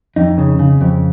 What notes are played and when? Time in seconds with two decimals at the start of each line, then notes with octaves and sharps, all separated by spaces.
0.16 F2 D#4
0.38 C#3
0.59 C#3
0.81 F2